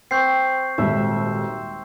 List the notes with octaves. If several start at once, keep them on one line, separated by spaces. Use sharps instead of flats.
C4 C#6 G6 C7
D#1 G#1 D#2 E5